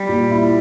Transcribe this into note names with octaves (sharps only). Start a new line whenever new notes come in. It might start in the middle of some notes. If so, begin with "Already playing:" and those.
Already playing: G3
A#2
E4